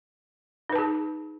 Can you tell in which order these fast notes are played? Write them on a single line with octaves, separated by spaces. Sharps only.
D#4 B4 A5 G#4